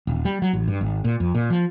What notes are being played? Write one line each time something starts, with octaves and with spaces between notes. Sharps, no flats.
D#1
G3
F#3
A1
G2
G#1
A#2
F2
A#2
F3